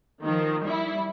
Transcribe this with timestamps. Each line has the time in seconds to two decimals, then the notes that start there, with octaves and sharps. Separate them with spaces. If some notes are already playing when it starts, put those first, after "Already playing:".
0.22 D#3 F3
0.62 G3 E4